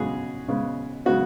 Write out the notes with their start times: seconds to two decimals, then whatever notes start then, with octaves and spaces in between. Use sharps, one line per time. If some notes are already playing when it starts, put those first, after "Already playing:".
Already playing: C#3 G#3 B3 F#4 G#4
0.48 C#3 G#3 B3
1.05 C#3 G#3 B3 F#4